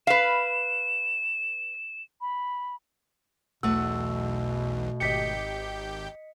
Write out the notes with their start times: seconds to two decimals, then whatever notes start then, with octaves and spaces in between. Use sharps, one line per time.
0.07 B4 F5 E7
2.21 B5
3.63 B1 E2 B2 A3 F#5 E6
5.00 G#1 G4 D#5 G6 B6 C#7